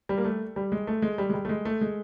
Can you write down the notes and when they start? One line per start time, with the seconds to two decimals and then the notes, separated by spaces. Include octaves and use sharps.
0.09 G3
0.17 A#3
0.25 A3
0.56 G3
0.72 G#3
0.87 A3
1.02 G#3
1.18 G3
1.30 G#3
1.34 G3
1.45 A3
1.49 G#3
1.65 A3
1.81 G#3